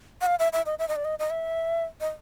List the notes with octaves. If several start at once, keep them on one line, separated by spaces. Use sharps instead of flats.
F#5
F5
E5
E5
D#5
E5
D#5
D5
D#5
D#5
E5
D#5